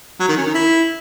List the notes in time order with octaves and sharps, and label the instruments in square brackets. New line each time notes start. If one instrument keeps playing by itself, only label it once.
[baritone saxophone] F#3
D#3
C#4
D#3
E4